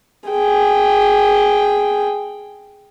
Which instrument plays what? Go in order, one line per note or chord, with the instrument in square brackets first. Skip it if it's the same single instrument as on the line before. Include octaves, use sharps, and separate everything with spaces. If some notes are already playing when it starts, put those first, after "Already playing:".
[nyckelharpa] G#4 G5